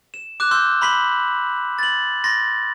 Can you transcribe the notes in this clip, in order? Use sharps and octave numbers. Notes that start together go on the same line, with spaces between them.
E7
D6 F#6 E7
C6 E6 G6
B5 C6 B6 F#7
A6 F#7
C6 A6 A#6